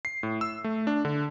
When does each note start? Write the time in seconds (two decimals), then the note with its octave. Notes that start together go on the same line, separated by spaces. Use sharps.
0.05 C7
0.23 A2
0.41 E6
0.64 A3
0.87 D4
1.05 D3